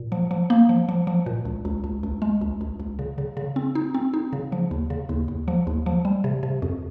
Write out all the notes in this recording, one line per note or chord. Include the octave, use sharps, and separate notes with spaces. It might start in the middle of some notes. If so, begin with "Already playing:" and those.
Already playing: A#2
F3
F3
A#3
F3
F3
F3
A#2
C#2
C#2
C#2
C#2
G#3
C#2
C#2
C#2
C#3
C#3
C#3
C4
D#4
C4
D#4
C#3
F3
D#2
C#3
D#2
D#2
F3
D#2
F3
G3
C3
C3
F2